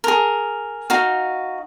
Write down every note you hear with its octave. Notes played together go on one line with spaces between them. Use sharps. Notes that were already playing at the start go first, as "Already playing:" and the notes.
G#4 A#4
D#4 F#4 F5